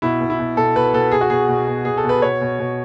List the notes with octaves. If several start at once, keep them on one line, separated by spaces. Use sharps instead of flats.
B2 E4
B2
E4
B2
B2 A4
B2 B4
B2 A4
B2 G#4
F#4
B2 G#4
B2
B2
B2 G#4
A4
B2
B4
B2 C#5
B2
B2